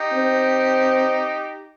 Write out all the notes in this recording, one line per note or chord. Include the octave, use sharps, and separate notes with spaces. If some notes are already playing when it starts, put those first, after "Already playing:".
Already playing: D#4 G4
C4